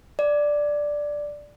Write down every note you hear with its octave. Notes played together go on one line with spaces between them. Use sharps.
D5